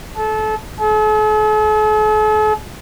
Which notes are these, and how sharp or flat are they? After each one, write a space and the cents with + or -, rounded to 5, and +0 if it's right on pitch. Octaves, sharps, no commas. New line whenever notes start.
A4 -25
A4 -45